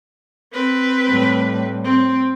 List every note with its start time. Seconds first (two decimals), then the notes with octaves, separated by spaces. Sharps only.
0.53 C4 B4
1.07 A2 G3
1.84 C4